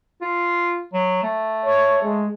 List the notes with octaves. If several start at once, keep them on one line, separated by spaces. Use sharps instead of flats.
F4
F#3
A3
C#5
G#3